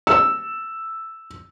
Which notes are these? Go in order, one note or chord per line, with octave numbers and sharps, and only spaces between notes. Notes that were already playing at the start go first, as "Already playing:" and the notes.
E6